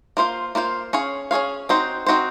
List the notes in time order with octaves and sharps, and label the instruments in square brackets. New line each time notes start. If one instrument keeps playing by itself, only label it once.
[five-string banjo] A#3 F4 C5 F5
A#3 F4 C5 F5
C#4 G#4 C#5 F5
C#4 G#4 C#5 F5
C4 D#4 F#4 C5
C4 D#4 F#4 C5